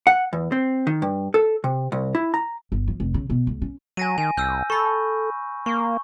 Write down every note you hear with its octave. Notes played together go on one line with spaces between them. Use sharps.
F#5
E2
C4
D#3
G2
A4
C3
C2
E4
A#5
G1
F3
F1
C#3
B2
C#2
C#4
F#3 G#5 A#6 D#7
D#3 G#5
C2 E6 F6 G6
A4 B5 C#6
A#3 C#6